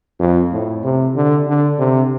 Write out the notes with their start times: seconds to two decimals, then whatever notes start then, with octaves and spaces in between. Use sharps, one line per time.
0.20 F2
0.52 A2
0.84 C3
1.16 D3
1.47 D3
1.79 C3